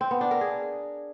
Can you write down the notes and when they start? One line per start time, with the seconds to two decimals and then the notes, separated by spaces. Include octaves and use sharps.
0.01 C4
0.11 B3
0.21 D4
0.31 A#4
0.41 G#4